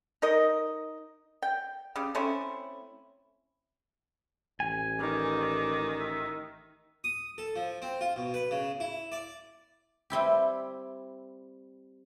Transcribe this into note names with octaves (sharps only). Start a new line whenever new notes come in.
D#4 A#4 D#5
G5
C#3 G3
A3 C4 C#4 E4
A1 G#5
D#3 D5
E5
D#6
A4
F3
C4
F4
B2
B4
C#3
E4
D5
G3 C4 E4 G4